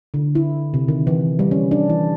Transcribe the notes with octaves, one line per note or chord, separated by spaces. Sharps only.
D3
E4
C3
D#3
E3
G3
C#4
D4
E3